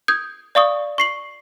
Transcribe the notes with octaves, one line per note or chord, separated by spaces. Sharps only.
D#6 G6 G#6
D5 F5 C#6 D#6
C#6 C7 F#7